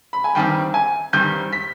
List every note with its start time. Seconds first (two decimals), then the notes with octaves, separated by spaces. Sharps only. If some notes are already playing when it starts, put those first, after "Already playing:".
0.13 B5
0.24 G#5
0.35 G2 D#3 G3 C4 G5
0.74 G#5
1.13 G2 D#3 G3 C4 G6
1.53 B6